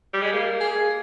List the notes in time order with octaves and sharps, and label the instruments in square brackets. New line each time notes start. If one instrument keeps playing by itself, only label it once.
[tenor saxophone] G3
G#3
A#3
[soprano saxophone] G#4